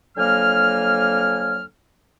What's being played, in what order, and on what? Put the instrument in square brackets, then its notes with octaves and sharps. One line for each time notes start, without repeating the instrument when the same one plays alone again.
[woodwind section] F2 D3 F#3 A#3 G#5 F6